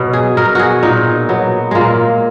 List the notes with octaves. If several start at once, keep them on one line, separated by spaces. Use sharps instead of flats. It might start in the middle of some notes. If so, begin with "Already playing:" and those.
Already playing: B2 F#3
G#4
B2 A#4
F#4 G#4
A#2 D#4
F#3 B3
A#2 G#3 A#3